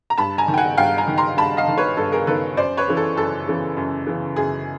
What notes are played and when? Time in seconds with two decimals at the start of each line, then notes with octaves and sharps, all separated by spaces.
0.10 A#5
0.18 G2 A5 B5
0.38 G#5 A#5
0.48 D#3
0.54 G5
0.58 F#5 G#5
0.77 G2 F5 G5
0.98 G#5 A#5
1.08 D#3
1.17 A#5 C6
1.37 G2 A5 B5
1.57 D#5 F5
1.68 D#3
1.78 B4 C#5
1.97 G2 A4
2.12 G#4 A#4
2.27 D#3 A4 B4
2.57 F#2 C5 D5
2.77 B4 C#5
2.88 C#3 E3
2.97 A4
3.16 F#2 A4
3.47 C#3 E3
3.77 F#2
4.07 C#3 E3
4.36 F#2 G#4